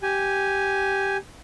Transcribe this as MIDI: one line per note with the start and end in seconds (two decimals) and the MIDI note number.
0.03 1.17 67
0.03 1.17 80